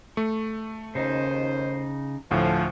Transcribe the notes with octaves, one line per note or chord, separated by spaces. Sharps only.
A3 C#6
D#2 C#3 D#4 C5
D2 A2 F3